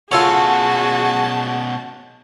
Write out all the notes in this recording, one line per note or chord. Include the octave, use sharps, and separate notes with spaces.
B2 C#4 F4 F#4 G#4 A4 C#5 A5